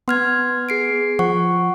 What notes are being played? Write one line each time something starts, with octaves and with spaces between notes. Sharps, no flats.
B3 C6 F6 G#6
G#4 C7 D7
F3 F#5 C#6